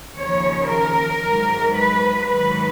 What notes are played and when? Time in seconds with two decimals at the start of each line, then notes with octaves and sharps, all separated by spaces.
0.18 D#2 C#3 F3 C#5
0.71 A#4
1.25 G#2 F#3
1.77 B4
2.29 G#2 D#3 F#3 B4